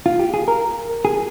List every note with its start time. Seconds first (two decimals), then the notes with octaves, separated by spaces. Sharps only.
0.06 F4
0.19 G4
0.34 G#4
0.48 A#4
1.05 G#4